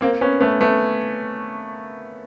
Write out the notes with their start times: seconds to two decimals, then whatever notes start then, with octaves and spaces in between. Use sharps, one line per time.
0.01 A#3 C4
0.21 B3 C#4
0.41 A3 B3
0.61 A3 B3